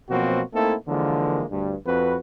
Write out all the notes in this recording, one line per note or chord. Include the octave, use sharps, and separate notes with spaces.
B2 F3 F#3 A#3 C4 F#4
A3 A#3 C4 D#4 E4 A4
D3 E3 F3 G#3 A#3
D2 G2
F2 C4 F#4 B4